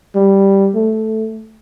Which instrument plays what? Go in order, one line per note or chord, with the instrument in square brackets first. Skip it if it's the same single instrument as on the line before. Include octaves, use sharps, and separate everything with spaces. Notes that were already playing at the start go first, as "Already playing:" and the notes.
[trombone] G3
A3